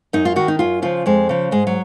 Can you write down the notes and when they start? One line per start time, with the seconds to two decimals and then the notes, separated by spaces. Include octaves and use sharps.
0.13 F#2 D#4
0.25 F4
0.36 D#3 F#4
0.48 D#4
0.59 F#2 F4
0.82 C#3 F3 F4
1.06 F2 G#3
1.29 C#3 F3
1.51 G#2 G#3
1.67 F#3